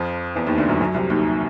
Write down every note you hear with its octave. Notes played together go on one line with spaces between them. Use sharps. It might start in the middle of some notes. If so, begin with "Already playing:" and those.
Already playing: F2 F3
E2 E3
D#2 D#3
D2 D3
F#2 F#3
F#2 F#3
C2 C3
D#2 D#3